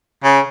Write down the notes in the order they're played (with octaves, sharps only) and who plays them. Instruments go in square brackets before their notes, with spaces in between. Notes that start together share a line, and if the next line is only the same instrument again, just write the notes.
[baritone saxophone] C#3